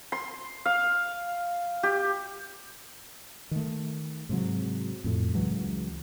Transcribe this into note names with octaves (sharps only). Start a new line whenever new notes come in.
C6
F5
G4
D#3 A3
G#2 C3 F#3
F2 A2
C#2 E3 F#3 G#3